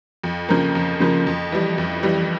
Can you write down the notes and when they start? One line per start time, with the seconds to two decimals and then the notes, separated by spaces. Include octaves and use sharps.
0.24 F2
0.49 C#3 F3 A#3
0.75 F2
1.00 C#3 F3 A#3
1.27 F2
1.52 E3 G3
1.78 F2
2.03 E3 G3